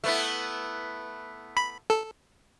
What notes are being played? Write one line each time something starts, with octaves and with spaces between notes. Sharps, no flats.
A3 B3 E4
B5
A4